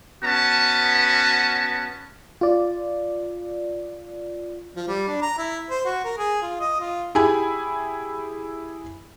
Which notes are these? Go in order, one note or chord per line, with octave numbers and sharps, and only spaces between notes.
B3 C#4 F#4 A5
F4 D5
F3
G3
D4
A#5
E4
C5
F#4
A#4
G#4
F4
D#5
F4
E4 G4 G#4 G#5 B5